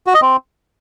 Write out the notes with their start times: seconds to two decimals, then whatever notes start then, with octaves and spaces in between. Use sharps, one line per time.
0.07 F#4
0.14 D#5
0.22 C4